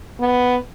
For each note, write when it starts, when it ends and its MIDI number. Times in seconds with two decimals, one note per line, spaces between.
0.20 0.56 59